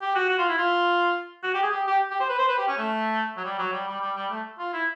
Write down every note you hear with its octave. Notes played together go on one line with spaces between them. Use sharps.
G4
F#4
F#4
F4
E4
F4
F#4
G4
G#4
G4
G4
G4
C5
B4
C5
B4
G4
C#4
A3
F#3
G3
F#3
G3
G3
G3
G3
A3
F4
E4